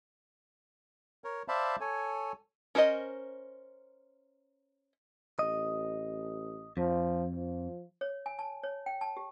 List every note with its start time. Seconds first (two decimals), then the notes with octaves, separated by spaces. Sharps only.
1.24 A#4 C#5
1.48 C5 D5 E5 F5 A5 B5
1.80 A4 C#5 G#5
2.75 C#4 A#4 C5 C#5 D#5
5.39 A1 D#5
6.77 F2 F3
7.34 F3
8.01 C#5
8.26 G#5
8.39 A5
8.63 C#5
8.86 G5
9.01 A5
9.17 G4